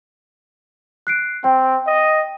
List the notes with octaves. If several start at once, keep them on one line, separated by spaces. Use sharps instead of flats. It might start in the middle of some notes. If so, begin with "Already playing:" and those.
F#6 C7 D7
C4 G5
D#5